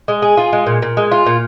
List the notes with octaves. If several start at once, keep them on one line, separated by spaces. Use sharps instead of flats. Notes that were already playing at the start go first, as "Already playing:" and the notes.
G#3
G#4
F4
G#3
A#2
A#2
G#3
F4
A#2